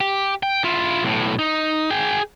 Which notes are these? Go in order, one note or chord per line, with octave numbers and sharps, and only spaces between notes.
G4
G5
E4 F4
B1 A2
D#4
G#4 G5